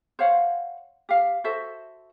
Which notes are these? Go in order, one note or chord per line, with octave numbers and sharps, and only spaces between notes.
C5 C#5 F5 F#5
G4 F5
F#4 A4 C5 E5